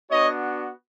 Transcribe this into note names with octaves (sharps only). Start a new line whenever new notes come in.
B3 D4 F#4 C#5 D#5